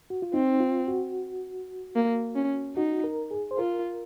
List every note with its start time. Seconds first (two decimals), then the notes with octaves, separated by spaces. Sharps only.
0.10 F#4
0.22 F4
0.34 C4 D#4
0.60 F4
0.88 F#4
1.96 A#3
2.36 C#4
2.76 D#4 F#4
3.04 A#4
3.31 G#4
3.51 C5
3.58 F4 A#4